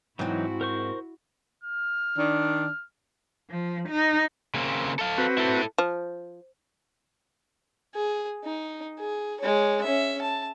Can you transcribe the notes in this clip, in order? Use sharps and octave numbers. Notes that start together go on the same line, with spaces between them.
G#2 E3 F#3 C4 D#4 E4 F#4
A#4 C5 C#6
F6
D#3 D4
F3
D#4
C#3 A#3 C4
A4 F5
C4 F#4 B4
E4 A4
F3
G#4
D#4
G#4
G#3 C#5
C#4 E5
A5